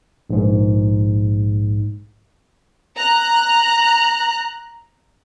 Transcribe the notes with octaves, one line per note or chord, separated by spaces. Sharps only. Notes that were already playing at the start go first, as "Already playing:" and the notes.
A#1 G#2
A#5 F#6